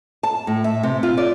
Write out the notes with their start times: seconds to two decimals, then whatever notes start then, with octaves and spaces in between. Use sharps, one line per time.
0.23 A5
0.47 A2
0.64 E5
0.83 C3
1.03 F4
1.18 D5